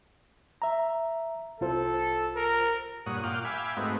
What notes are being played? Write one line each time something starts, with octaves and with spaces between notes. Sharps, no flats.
E5 A#5
C2 F4 A4 C5
A#4
G2 A#2 C#5 F#5 D#6
A#2 F4 F#5 G5 D6 F6
E5 F5 G5 G#5 B5 D6
G#2 A3 C4 D#4 F#4 B4